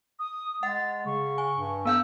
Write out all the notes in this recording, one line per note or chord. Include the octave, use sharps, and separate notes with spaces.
D#6
G#3 F#5 A6
C#3 C#6
G#5
G2
B3 F5 E6 G6